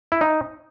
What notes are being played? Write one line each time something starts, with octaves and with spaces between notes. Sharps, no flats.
E4
D#4